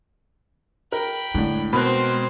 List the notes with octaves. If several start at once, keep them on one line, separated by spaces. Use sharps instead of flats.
A#4 G5 B5
A2 D3 G#3
B2 C4 A#4 C5 B5 F#6